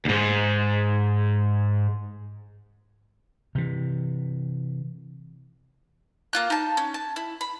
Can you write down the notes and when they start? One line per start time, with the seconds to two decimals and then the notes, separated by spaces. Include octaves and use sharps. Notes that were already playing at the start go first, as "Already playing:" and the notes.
0.05 D2 G#2
3.55 C3 E3
6.33 A#3 F4 F#6
6.50 D#4 A5
6.77 C#4
6.94 A5
7.16 E4
7.41 B5